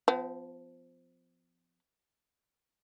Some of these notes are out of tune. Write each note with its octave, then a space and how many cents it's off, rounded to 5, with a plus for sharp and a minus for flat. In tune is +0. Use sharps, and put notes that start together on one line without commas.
F3 +0 B3 +45